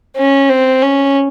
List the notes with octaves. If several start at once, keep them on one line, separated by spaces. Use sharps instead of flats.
C#4
C4
C#4